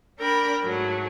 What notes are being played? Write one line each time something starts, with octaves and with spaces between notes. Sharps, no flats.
D4 A#4 G5 B5
G#2 F#3 A3